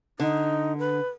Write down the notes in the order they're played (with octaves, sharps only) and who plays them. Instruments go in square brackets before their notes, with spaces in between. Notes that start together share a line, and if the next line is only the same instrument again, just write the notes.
[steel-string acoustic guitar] D3 [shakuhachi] D#4
[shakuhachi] B4